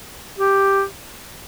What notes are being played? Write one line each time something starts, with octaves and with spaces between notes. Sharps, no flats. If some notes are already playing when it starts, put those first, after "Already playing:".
G4